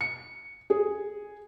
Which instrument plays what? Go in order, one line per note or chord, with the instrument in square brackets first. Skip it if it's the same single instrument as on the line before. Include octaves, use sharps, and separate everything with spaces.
[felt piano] C#7
G#4